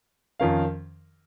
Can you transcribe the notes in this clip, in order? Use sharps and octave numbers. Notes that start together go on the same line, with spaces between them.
F2 D#3 C#4 A#4 F5